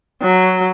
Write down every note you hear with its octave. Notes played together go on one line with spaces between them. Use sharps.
F#3